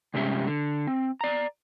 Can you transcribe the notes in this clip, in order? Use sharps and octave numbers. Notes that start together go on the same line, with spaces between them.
G2 C3 G#3 C#4 G4 E5
D3
C4
D5 A#5